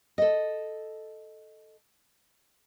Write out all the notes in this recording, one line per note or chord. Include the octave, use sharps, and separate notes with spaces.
A4 D#5